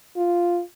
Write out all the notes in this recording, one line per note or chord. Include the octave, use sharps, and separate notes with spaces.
F4